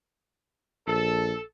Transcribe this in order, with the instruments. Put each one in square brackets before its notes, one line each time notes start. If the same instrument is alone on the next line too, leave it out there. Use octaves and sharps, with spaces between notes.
[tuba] A#1 [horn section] A4